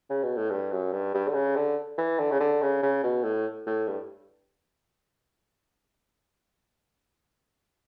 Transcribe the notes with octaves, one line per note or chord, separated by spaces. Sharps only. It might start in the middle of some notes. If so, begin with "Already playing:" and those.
C#3
B2
A2
G2
F#2
G2
G2
D3
C#3
D3
E3
D3
C#3
D3
C#3
C#3
B2
A2
A2
G2